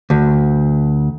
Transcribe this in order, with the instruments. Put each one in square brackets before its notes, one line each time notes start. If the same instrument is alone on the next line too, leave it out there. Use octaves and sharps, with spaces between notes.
[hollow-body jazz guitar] D2